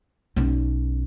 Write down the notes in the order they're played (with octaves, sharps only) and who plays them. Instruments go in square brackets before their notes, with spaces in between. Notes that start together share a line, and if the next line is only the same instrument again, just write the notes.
[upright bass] B1 C#4